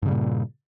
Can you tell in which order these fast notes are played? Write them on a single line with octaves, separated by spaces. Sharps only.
G2 C#3 G3 A#2